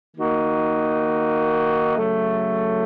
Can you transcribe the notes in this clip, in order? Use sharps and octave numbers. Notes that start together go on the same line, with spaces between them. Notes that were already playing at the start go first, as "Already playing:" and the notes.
D#3 A#3 D#4 F#4
C#3 F#3 A3